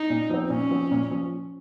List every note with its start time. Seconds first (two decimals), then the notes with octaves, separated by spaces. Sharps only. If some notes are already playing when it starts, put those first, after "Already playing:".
Already playing: D#4
0.10 A#2
0.30 F3 C4
0.50 A#2 C#4
0.71 F3 C4
0.91 A#2
1.11 F3